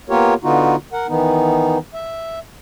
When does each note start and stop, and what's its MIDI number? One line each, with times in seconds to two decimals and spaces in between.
0.09 0.34 58
0.09 0.34 59
0.09 0.34 65
0.09 0.34 67
0.09 0.34 70
0.09 0.34 73
0.43 0.76 50
0.43 0.76 59
0.43 0.76 63
0.43 0.76 65
0.43 0.76 66
0.93 1.07 70
0.93 1.07 78
1.08 1.78 51
1.08 1.78 52
1.08 1.78 59
1.08 1.78 63
1.94 2.39 76